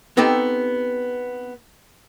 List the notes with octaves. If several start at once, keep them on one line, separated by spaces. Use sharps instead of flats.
B3 C4 D#4 G4 A4